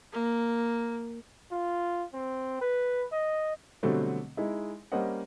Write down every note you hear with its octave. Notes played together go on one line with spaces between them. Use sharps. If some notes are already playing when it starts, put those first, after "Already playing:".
A#3
F4
C4
B4
D#5
B2 D3 F#3 G3 A3 C4
G#3 D#4 E4
G3 A#3 C#4 C5 D#5 F#5